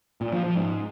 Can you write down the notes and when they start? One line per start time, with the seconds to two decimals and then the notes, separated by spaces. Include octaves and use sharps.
0.21 A#2
0.32 F3
0.44 F3
0.55 G#2